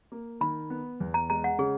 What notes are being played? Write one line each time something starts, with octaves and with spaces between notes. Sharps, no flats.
A#3
D#3 B5
B3
E2
A#5
G#3 A#5
F#5
C#3 G#4